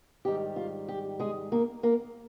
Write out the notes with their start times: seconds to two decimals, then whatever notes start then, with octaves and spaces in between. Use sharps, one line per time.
0.25 G#2 D#3 G3 G4
0.56 F4
0.88 G4
1.19 G#3 G#4
1.52 A#3 A#4
1.83 A#3 A#4